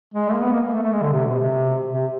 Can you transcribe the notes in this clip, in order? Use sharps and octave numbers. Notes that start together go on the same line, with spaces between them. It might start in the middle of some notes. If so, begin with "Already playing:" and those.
G#3
A3
A#3
B3
A#3
A#3
A3
A3
G#3
D3
C3
B2
C3
C3